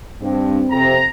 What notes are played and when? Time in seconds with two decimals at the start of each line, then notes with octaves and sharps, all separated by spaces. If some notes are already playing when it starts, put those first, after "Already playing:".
0.20 G2 C4
0.71 F2 C3 A#5